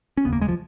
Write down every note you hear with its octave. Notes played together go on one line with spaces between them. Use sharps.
C#4
F1 D#2 C#3 B3
A#3
G#3
F3